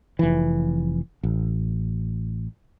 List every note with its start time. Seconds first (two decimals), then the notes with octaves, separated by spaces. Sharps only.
0.19 F1 E3
1.23 A1